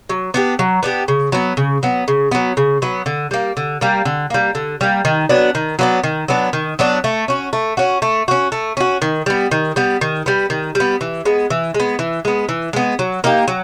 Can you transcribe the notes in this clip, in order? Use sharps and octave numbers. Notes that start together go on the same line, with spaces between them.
F#3
B3 D4 G4
F#3
B3 D4 G4
C#3
F#3 B3
C#3
F#3 B3
C#3
F#3 B3
C#3
F#3 B3
D3
G3 A#3
D3
G3 A#3
D3
G3 A#3
D3
G3 A#3
D#3
F#3 B3 D4
D#3
F#3 B3 D4
D#3
F#3 B3 D4
D#3
F#3 B3 D4
A3
C#4 F#4
A3
C#4 F#4
A3
C#4 F#4
A3
C#4 F#4
D#3
G3 B3
D#3
G3 B3
D#3
G3 B3
D#3
G3
B3
E3
G#3 B3
E3
G#3
B3
E3
G#3 B3
E3
G#3 B3
F#3
A#3 D#4 G4
F#3